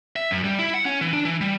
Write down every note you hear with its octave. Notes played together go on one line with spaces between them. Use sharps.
E5
F#2
G3
E4
F#5
C#4
E3
D4
E3
G3